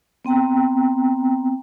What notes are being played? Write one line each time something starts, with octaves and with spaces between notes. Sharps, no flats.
B3 C4 G5 A#5